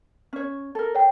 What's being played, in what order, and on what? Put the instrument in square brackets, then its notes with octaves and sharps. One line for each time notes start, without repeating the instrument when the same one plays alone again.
[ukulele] C#4 C#5
A4 A#4
[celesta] C#5 G5